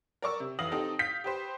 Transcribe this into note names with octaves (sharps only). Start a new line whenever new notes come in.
A#4 D5 C#6 E6
C3
F1 E3 F5 D#6 A#6 F#7
C4 D#4 G4 A4
F5 G6 B6
G4 B4 C5